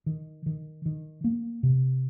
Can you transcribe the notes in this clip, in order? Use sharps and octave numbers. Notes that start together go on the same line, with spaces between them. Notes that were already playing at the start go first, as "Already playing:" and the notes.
D#3
D#3
D#3
A#3
C3